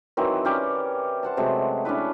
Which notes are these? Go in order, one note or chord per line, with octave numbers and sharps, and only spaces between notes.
D#3 E3 F#3 C4
C#4 G4 A#4 D5
C5 F#5 A5
C3 F#3 G#3 A3
C#4 D4 E4 B4